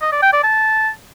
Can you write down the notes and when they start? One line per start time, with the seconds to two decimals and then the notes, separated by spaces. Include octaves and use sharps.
0.02 D#5
0.12 D5
0.23 G5
0.33 D5
0.43 A5